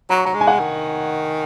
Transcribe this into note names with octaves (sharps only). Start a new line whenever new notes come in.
F#3 A#5
C#6
F#3 A#5
G#3
G#5
F#5
D#3